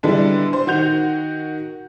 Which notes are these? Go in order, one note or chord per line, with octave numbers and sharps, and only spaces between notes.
D3 G3 G#3 B3 D4 E4
C5
D#3 F#4 G6 F7